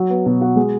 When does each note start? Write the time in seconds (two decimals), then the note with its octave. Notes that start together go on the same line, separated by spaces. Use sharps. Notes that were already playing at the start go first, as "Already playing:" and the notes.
Already playing: F#3
0.10 B3
0.26 B2
0.41 F#4
0.56 G#3